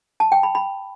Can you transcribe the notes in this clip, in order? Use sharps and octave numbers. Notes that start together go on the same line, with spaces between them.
A5
G5
B5
B5